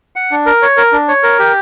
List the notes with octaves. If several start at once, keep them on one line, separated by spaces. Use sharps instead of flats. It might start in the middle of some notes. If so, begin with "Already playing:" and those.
F#5
D4
A#4
C#5
A#4
D4
C#5
A#4
G4